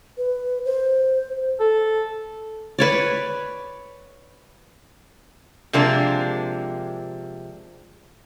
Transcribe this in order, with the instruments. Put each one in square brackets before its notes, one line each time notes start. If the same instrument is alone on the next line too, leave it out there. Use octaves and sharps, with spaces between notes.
[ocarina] B4
C5
[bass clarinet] A4
[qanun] B4 C#5 D5
[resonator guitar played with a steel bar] C3 F3 G#3 A#3 D4